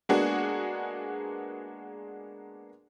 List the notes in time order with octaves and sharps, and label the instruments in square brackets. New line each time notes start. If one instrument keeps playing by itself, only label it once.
[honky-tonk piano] G#3 A#3 B3 D4 F#4 G#4